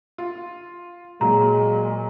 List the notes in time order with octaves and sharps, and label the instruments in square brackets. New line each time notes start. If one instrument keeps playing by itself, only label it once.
[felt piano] F4
[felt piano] A#2 F#3 [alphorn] G#3 [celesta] A#5